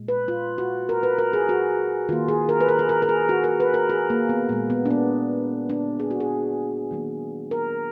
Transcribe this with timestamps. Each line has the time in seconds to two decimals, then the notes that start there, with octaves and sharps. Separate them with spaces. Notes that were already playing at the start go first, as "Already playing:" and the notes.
Already playing: A#2 G#3
0.08 B4
0.28 F4
0.58 F#4
0.89 A#4
1.03 B4
1.18 A#4
1.33 G#4
1.49 F#4
2.09 D#3 A#3 F4
2.28 G#4
2.49 A#4
2.61 B4
2.69 A#4
2.79 G#4
2.89 A#4
3.02 A#4
3.09 G#4
3.29 F#4
3.44 A#4
3.60 B4
3.74 A#4
3.90 G#4
4.10 A#3
4.29 B3
4.49 A#2 G#3 A#3
4.70 B3
4.86 D4
4.90 B3
5.70 D4
6.00 G#4
6.11 F#4
6.20 G#4
6.91 D#3 F#3 A#3
7.51 A#4